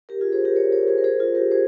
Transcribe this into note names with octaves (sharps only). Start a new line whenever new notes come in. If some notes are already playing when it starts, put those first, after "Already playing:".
G4 A#4
F4 G#4
G#4 C5
G4 A#4
A#4 C#5
A#4 C#5
G#4 C5
A#4
G#4 C5
F4 G#4
G4 A#4
G#4 C5